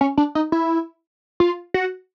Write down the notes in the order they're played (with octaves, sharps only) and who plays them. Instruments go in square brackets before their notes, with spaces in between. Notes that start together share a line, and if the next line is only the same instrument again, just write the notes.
[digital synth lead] C#4
D4
D#4
E4
F4
F#4